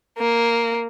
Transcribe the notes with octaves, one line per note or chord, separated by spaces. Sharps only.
A#3